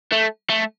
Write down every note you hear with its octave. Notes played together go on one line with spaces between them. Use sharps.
A3
A3